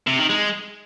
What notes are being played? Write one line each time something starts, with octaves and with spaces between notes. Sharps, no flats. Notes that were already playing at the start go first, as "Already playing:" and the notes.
C3
D#3
G#3